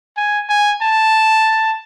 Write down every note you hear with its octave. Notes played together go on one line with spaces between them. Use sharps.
G#5
G#5
A5